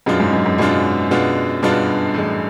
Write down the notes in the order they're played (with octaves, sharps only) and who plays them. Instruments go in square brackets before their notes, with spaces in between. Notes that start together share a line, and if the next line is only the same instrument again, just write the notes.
[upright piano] F#2 [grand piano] B2 G#3 B3 D4 F4
[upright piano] G#2
F#2
F#2
[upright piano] F#2 [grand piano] B2 G#3 B3 D4 F4
[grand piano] B2 G#3 B3 D4 F4
[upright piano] G2 [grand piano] B2 G#3 B3 D4 F4
[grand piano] A2 E3 G#3